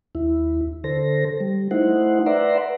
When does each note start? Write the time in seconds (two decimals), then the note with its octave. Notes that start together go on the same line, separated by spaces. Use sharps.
0.15 D#2 E4
0.84 D3 A4 C5 A#6
1.40 G3
1.71 A3 D#4 E4 C5 F#5
2.26 B4 D5 E5 F#5 A#5 C6